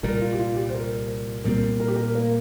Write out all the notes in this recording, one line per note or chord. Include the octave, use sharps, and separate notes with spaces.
C2 A#2 G3 A#4
F4
G4
F4
G4
C5
A#4
A#2 G3 C4 A#4
A#4
G4
A#4
A#3